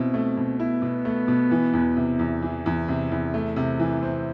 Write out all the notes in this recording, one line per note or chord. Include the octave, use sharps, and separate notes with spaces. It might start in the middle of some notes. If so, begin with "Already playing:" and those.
Already playing: B2 C4 E4
A3
B2
B3 E4
B2
A3
B2
E3
E2
C3
E2
E3
E2
C3
E2
A3
C3
E3
C4